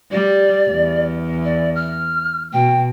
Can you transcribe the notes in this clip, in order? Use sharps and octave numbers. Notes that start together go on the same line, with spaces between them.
G3 D5
E2
D5
F6
B2 G5